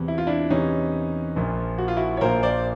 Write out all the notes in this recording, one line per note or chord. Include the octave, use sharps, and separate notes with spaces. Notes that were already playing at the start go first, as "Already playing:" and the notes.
Already playing: E2 C3 E3
E4
F4
D4 E4
E2 C3 E3 C#4 D#4
A#1 A#2 F3 A#3
F#4
F4
E4 F#4
C#5
A#1 A#2 F3 A#3 A#4 C5
C5 D5